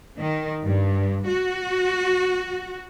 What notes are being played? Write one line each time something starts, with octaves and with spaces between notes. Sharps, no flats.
D#3
G2
F#4